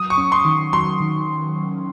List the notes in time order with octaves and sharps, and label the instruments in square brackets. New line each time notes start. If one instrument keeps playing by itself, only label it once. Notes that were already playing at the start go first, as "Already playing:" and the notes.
Already playing: [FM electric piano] F#3 [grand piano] D#6
[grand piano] C#6
[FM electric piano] C#4
[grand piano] C6
[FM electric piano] D#3
[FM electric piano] F#3 [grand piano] C6
[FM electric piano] D#3